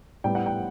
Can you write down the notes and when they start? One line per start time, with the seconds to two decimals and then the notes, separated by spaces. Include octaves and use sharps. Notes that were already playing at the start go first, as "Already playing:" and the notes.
0.24 A2 G3 B3 G5
0.35 F#5
0.46 G5